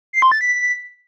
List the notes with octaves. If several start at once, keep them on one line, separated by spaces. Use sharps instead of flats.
C7
C6
A6
B6